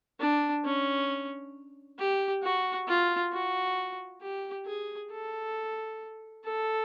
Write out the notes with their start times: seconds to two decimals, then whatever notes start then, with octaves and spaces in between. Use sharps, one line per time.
0.20 D4
0.64 C#4
1.98 G4
2.43 F#4
2.87 F4
3.32 F#4
4.21 G4
4.66 G#4
5.11 A4
6.44 A4